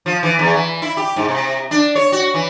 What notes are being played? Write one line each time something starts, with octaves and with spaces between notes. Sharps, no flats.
F3
E3
E2
E3
E4
G4
G#2
C3
D4
C#5
F#4
E3